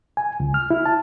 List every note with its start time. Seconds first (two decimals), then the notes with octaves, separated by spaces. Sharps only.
0.17 G#5
0.40 C#2
0.54 F6
0.70 E4
0.86 A5